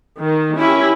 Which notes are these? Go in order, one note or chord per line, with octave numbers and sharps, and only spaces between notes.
D#3
C#4 E4 G4